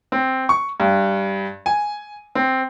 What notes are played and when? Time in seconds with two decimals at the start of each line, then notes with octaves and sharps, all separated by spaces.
0.12 C4
0.49 C#6
0.80 G2
1.66 G#5
2.35 C4